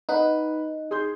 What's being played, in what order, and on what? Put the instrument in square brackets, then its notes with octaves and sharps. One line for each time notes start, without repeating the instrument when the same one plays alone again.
[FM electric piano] D#4 [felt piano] B4 F#5
[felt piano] G#4 C6 G6